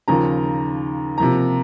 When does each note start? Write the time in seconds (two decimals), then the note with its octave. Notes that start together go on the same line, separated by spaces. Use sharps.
0.08 D#2 C#3 F3 A#5
1.18 C3 F3 A#3 A#5